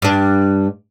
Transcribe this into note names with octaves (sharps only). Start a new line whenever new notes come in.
G2 D4